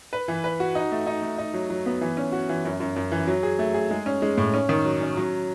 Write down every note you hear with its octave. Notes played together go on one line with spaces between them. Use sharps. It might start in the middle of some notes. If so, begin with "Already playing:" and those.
B4
E3
B4
F#4
D#4
A3
D#4
A3
D#4
F#3
F#3
B3
E3
C#4
F#4
E3
F#2
F#2
F#2
E3
F#3
G#4
A3
G#4
G#3
C#4
G#3
A2
C#4
D#3
F#3
C#4
F#3